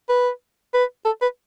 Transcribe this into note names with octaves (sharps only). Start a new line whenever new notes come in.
B4
B4
A4
B4